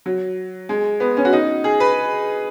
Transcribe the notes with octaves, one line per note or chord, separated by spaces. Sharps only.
F#3
G#3
B3
C#4
F#4
D#4
G#4
B4